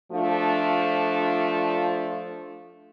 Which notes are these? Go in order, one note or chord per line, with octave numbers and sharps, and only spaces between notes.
F3 A3 D4 F4